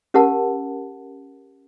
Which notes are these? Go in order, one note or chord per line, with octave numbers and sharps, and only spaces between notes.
C#4 G4 A#4 F#5 A5